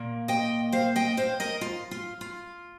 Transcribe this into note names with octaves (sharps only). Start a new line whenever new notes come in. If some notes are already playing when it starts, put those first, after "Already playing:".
Already playing: A#2 A#3
D#5 G5
C5 F5
D#5 G5
C5 F5
A#4 D#5
F4
F4
F4